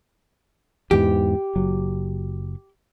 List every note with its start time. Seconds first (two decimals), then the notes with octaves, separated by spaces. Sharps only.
0.91 E2 G#2 E3 G4
1.56 F#1 F#3